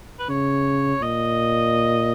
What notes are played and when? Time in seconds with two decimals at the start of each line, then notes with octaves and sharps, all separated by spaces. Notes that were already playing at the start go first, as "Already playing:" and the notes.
0.19 B4
0.29 C#3 C#5
1.02 A#2 D#5